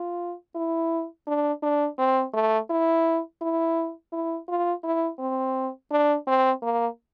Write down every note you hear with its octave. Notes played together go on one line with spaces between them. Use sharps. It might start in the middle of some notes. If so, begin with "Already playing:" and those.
Already playing: F4
E4
D4
D4
C4
A3
E4
E4
E4
F4
E4
C4
D4
C4
A#3